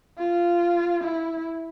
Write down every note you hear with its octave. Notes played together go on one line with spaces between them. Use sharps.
F4
E4